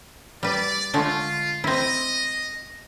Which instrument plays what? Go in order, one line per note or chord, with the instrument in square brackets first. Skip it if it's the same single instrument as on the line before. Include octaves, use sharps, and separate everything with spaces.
[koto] G3 B4 [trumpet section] D5
[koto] D3 G#3 A3 [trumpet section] F4
[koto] C4 E4 [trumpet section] D#5